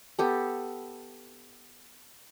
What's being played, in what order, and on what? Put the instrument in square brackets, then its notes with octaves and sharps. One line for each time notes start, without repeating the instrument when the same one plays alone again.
[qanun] B3 G4 A4